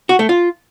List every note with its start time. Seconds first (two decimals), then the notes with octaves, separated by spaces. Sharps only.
0.09 F#4
0.19 A3
0.29 F4